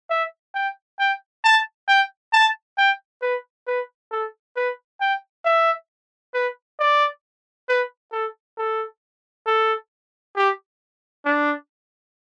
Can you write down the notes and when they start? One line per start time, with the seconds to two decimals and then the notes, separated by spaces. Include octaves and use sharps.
0.10 E5
0.55 G5
0.99 G5
1.44 A5
1.88 G5
2.33 A5
2.78 G5
3.22 B4
3.67 B4
4.11 A4
4.56 B4
5.01 G5
5.45 E5
6.34 B4
6.80 D5
7.69 B4
8.12 A4
8.58 A4
9.47 A4
10.36 G4
11.25 D4